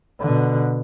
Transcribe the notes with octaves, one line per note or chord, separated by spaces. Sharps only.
B2 D3